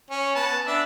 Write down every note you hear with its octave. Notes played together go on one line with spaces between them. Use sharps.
C#4
B3 A5
D4 E5